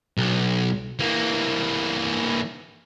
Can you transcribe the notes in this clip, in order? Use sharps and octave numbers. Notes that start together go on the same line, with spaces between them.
B1
E3 A#3